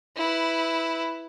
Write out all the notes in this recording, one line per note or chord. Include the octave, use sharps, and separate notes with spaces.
E4 B4